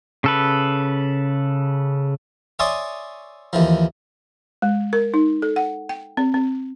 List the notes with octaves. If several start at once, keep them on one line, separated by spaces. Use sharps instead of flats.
C#3 A4 B4
C#5 D5 E5 G#5 C6 D#6
D#2 E3 F3
G#3
A#4
D#4
A4
F#5
G5
C4
C4